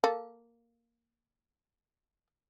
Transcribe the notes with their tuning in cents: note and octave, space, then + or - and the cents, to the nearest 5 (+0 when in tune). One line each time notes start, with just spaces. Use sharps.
A#3 +0 A4 +0